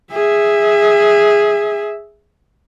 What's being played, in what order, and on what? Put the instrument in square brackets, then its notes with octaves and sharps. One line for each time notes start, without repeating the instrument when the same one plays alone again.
[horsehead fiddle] G#4 E5